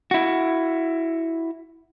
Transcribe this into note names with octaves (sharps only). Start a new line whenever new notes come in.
E4 F#4